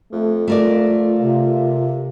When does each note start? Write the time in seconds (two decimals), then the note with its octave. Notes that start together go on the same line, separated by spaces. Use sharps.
0.12 F2 A3
0.48 A3 F4 A#4 D5
1.19 C3 A#3